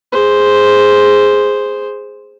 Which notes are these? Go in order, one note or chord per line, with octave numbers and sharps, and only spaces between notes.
G#4 C5